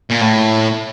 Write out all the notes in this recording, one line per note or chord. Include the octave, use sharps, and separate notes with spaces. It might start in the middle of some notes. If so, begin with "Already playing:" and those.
A#2
A2